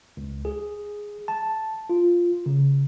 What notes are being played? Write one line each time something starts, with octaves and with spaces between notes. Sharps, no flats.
C#2
G#4
A5
F4
C#3